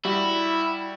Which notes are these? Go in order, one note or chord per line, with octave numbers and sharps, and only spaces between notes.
G3 E4 F#4